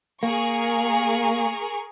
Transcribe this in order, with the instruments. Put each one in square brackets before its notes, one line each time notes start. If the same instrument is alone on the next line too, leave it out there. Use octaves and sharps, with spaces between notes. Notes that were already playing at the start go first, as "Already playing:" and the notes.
[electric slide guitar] A#3 [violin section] G#4 A#4 C#6